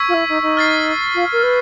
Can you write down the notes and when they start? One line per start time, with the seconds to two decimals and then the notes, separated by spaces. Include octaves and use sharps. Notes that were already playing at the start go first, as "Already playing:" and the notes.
Already playing: C#6 E6 G#6 B6
0.08 F4
0.14 E4
0.29 D#4
0.42 D#4
0.57 F6 A6 C7
1.14 F4
1.32 A#4
1.43 B4